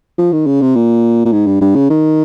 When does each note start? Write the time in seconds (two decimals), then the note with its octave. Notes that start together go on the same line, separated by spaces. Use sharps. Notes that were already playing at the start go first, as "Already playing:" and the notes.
0.18 F3
0.32 D#3
0.47 C#3
0.61 C3
0.75 A#2
1.25 A#2
1.33 G#2
1.46 G2
1.61 G2
1.75 C#3
1.90 D#3